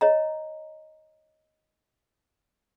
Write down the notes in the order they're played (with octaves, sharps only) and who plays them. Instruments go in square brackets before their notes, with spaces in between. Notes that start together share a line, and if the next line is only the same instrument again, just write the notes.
[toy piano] C#5 D#5 A#5